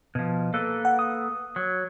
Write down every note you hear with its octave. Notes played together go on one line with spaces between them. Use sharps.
B2 F3
A#3 A4 B4
F#5
D#6
F#3